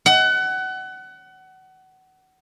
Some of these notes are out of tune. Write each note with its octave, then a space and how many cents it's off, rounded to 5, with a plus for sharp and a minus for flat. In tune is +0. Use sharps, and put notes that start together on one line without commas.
F#5 +25